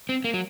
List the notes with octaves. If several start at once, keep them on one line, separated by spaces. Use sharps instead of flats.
C4
A#3
F#3